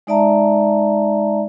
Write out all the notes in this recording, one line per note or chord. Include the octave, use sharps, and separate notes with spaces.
G#3 D#4 D5 E5 A5 A#5